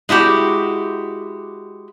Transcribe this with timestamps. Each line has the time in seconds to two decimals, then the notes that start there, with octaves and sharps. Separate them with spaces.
0.09 G#3 E4 F#4 G4